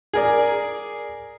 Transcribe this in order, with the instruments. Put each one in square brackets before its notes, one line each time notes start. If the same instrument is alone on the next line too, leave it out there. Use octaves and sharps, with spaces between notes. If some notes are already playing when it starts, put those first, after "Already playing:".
[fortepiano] G#4 A#4 D5